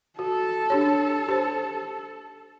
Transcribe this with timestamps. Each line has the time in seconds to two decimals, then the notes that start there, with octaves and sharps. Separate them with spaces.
0.19 F#4 A4
0.70 D4 G4 C#5
1.29 G4 C5